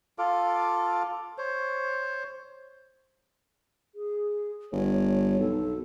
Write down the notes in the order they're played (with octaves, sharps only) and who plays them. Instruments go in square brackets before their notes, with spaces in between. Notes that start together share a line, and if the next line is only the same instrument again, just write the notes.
[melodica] F4 A4 F5 D6
C5 C#5
[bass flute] G#4
[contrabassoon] G1 [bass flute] C#5
[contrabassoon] B1 [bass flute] A4